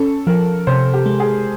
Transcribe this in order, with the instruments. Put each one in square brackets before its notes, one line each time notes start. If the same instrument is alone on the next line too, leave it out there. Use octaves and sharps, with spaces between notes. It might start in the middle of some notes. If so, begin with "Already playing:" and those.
Already playing: [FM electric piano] C#4 [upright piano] A4
[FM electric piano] F3 [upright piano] A#4
[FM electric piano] C3 [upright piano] C5
[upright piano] G4
[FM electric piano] G#3
[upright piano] G#4